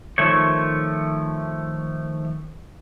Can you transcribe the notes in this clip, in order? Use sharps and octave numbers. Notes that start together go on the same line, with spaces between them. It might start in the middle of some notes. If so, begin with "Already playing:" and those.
D#3 F3 A3 C#5